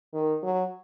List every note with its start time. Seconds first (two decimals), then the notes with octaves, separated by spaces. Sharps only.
0.14 D#3
0.43 F#3